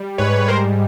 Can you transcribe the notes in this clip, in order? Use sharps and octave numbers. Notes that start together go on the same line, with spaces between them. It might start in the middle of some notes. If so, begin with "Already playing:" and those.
Already playing: G3
G#2 B4 C#5
B4
G3 A#4 C5